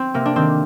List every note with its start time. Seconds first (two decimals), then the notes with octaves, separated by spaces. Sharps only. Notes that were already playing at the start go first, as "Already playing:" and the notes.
Already playing: C4
0.14 C3 A#3
0.26 D4
0.36 D#3 C4